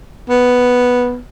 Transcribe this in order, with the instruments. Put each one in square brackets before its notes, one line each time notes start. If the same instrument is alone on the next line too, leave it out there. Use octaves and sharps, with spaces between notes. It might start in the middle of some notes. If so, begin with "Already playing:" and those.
[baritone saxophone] B3